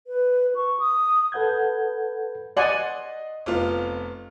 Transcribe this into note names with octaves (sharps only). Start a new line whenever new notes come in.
B4
C#6
D#6
A4 B4 F#5 G6 G#6
D5 D#5 F#5 G#5 C6 F#7
F1 B3 F4